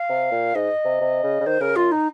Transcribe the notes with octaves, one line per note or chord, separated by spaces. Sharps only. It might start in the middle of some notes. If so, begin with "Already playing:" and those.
Already playing: F5
C3
A#2
G#2 D#5
C3
C3
C#3
C#3
D#3 C5
C#3 A#4
F#2 F4
D#4